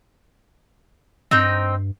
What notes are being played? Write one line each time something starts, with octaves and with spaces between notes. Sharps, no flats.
G2 C4 D#4 G5